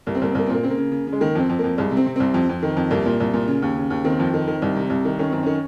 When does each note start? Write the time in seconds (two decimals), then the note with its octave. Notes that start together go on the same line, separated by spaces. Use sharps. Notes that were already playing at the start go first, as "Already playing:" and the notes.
0.07 C2 A#3
0.15 C4
0.21 C2 A#3
0.31 C4
0.35 C2 A#3
0.46 C4
0.50 A#2 A#3
0.63 C#3 C4
0.70 A#3
0.77 C#3
0.92 C#3
1.07 C#3
1.12 G#3
1.20 D#3 A#3
1.35 F2 C4
1.49 F2
1.59 A#3
1.64 F2
1.77 C2 G#3
1.91 C3
1.97 C4
2.06 C3
2.16 C2 C4
2.34 F2
2.49 F2
2.63 D#3
2.77 F2
2.91 C2 A#3
3.06 A#2
3.20 C2
3.34 A#2
3.48 C#3
3.62 D#2
3.76 C#3
3.90 D#2
4.04 D#3 C4
4.19 F2
4.34 D#3
4.48 D#3
4.62 C2
4.77 C3
4.90 C2
5.05 D#3
5.19 D#3 C#4
5.31 F#2 C4
5.43 D#3 C#4